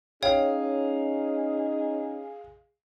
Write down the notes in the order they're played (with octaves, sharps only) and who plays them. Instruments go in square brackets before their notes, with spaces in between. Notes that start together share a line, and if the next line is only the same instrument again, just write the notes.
[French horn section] C#4 D#4 [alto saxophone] G#4 [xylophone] C#5 G5 [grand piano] F5